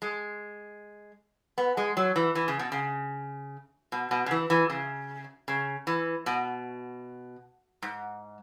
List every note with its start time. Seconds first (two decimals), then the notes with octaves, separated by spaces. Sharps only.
0.02 G#3
1.58 B3
1.77 G#3
1.97 F#3
2.16 E3
2.35 E3
2.48 C#3
2.59 B2
2.72 C#3
3.92 B2
4.11 B2
4.26 C#3
4.31 E3
4.50 E3
4.70 C#3
5.48 C#3
5.87 E3
6.26 B2
7.82 G#2